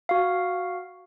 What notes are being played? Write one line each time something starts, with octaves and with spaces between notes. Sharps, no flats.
F#4 F5